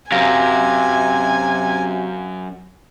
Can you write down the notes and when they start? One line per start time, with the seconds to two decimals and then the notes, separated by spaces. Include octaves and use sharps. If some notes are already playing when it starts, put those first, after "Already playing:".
0.12 F#2 C3 F5 G#5 A#6